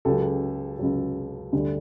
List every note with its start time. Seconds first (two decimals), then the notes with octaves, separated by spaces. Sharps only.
0.05 C#2 C#3 F#3 G4 A4
0.79 C#2 C#3 F#3
1.53 D2 D3 G3